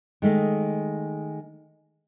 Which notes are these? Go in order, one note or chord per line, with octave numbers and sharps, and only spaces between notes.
D#3 G#3 A3